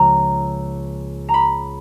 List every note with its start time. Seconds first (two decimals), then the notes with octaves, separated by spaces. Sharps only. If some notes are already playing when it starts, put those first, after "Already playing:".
Already playing: C#2 C#3 F3 A#3 C#5 A#5
1.29 A#5
1.34 B5